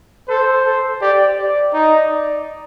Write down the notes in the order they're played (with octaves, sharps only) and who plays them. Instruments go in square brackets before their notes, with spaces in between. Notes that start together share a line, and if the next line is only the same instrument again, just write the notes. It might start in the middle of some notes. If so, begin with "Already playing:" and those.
[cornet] A4 [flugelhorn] C5
[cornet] A4
[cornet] G4 [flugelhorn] D5
[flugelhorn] D5
[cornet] D#4 [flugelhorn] D#5
[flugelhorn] D5